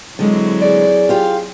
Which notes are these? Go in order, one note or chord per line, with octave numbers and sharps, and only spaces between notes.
D3 F#3 G#3 C4 E4
G#4 D5
F4 G4 F5